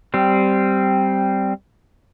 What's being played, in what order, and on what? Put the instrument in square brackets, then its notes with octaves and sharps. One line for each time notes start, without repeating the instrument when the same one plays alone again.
[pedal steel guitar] G3 C4